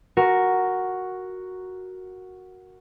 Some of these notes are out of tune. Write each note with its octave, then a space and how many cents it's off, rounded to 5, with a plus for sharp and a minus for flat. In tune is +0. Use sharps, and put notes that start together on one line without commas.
F#4 +0 A#4 +0